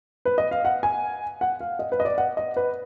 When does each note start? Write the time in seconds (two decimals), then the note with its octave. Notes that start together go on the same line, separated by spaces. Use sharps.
0.25 B4
0.38 D#5
0.51 F5
0.65 F#5
0.83 G#5
1.41 F#5
1.61 F5
1.79 D#5
1.92 B4
2.00 D#5
2.05 D5
2.18 F#5
2.37 D#5
2.56 B4